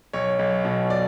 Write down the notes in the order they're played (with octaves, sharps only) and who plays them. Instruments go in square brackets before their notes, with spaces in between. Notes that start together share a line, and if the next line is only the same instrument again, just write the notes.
[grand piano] B1 C#5
B1
B2
D5